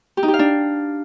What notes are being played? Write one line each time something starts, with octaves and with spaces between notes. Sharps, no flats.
G4
D#4
G4
F5
D4